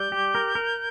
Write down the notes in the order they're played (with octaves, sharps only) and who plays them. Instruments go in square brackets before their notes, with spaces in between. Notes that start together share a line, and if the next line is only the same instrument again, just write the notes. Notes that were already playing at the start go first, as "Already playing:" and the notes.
Already playing: [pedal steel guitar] G3 [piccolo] G6
[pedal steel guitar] G4
A#4
A#4